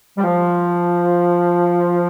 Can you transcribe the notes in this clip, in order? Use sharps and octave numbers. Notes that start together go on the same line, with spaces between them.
G3
F3